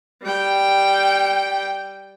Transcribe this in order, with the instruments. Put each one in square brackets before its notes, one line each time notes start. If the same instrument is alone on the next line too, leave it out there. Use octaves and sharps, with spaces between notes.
[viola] G3 G5